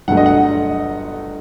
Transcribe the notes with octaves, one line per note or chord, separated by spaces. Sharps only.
G1 G2 F#3 A3 F#5
D#5
F#5